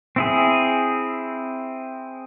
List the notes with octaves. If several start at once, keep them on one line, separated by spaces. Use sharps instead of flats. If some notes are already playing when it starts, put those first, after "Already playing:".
C4 E4 G#4